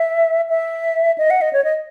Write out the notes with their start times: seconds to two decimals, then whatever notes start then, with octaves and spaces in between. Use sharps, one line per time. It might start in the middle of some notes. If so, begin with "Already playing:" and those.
Already playing: E5
0.49 E5
1.18 D#5
1.30 F#5
1.41 D#5
1.53 C#5
1.64 D#5